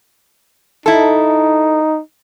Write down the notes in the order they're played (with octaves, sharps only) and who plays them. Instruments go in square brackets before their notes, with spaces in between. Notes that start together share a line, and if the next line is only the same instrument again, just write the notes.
[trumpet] D#4 [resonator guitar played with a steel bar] E4 A4